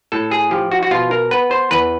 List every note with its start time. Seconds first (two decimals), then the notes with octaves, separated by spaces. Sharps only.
0.12 A2 A4
0.31 G#4
0.51 F3 G4
0.72 F#4
0.83 F#4
0.91 B2 F4
1.11 A#4
1.31 B3 B4
1.51 C5
1.71 E2 B4